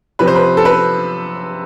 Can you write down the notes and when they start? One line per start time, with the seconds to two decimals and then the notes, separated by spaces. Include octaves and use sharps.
0.19 C3 F3 B4
0.27 C5
0.36 B4
0.57 A4
0.65 B4